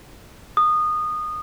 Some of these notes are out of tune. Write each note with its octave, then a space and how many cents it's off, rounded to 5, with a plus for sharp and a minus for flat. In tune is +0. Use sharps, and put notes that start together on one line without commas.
D#6 -20